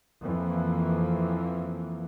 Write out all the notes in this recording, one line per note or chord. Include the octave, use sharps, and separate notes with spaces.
F2 E3 A#3